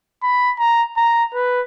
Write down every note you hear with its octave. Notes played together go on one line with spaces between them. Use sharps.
B5
A#5
A#5
B4